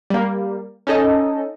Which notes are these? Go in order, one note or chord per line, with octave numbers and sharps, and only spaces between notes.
G3 A#3
C#4 D#4 A4 D#5